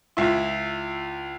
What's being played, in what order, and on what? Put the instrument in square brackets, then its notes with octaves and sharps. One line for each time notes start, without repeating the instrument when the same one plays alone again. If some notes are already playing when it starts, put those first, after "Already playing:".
[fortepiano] C#2 E4